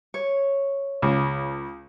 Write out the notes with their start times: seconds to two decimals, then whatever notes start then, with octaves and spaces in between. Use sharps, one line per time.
0.14 C#5
1.02 C#2